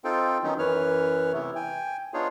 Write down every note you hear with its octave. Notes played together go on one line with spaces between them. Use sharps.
C4 D#4 F4 A4 G5
D#3 F#3 B3 C#4 D#4
F#2 E3 B4 C#5 F6
C3 E3 A3 B3 E4
G5 G#5
B3 D4 D#4 F4 G#4 C#5